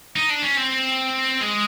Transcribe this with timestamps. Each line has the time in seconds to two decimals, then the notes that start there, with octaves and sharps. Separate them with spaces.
0.16 D#4
0.30 D4
0.43 C#4
0.57 C4
1.41 G#3